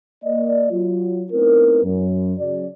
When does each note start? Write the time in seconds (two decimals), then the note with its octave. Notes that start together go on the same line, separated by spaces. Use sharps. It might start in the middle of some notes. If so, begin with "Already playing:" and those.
0.24 A#3 D5 D#5
0.71 F#3 F4
1.31 A3 B3 C4 D#4 E4 A#4
1.84 F#2
2.38 C#3 F#3 D5